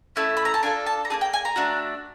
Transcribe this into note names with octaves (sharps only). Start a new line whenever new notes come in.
A3 C#4 E4
B5
A#5
A5
D4 F4 A4 G#5
A5
A#5
A#3 D#4 G#4 A5
G5
G#5
A#5
A3 D4 F#4